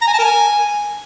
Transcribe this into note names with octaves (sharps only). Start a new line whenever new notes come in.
A#5
G#5
A5
A#4
G#5